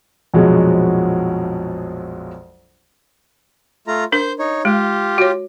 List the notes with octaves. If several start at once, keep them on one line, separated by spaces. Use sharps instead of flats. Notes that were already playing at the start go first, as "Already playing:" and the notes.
A#1 F2 B2 F3 F#3 G#3
A3 F4 A#5
D4 A#4 C5 G6
D#4 C#5
G#3 F4 G4
F#4 C#5